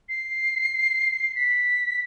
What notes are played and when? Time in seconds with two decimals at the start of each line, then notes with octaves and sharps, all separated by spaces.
0.09 C7
1.36 B6